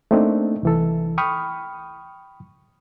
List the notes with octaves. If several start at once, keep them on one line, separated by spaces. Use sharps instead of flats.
A3 A#3 C4 D4 D#4
C2 E3 A4
G5 B5 C#6 D#6 F6